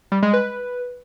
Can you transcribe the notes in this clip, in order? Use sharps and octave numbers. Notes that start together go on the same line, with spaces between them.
G3
G#3
B4